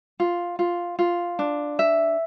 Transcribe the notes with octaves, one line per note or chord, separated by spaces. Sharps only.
F4
F4
F4
D4
E5